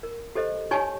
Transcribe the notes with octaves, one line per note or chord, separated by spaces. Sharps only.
A#4
G4 A4 C5 D#5
D#4 G4 C#5 G#5 A5 C#6